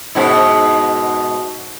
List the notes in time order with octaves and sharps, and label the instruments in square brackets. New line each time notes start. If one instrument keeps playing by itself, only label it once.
[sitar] G#2 B2 E4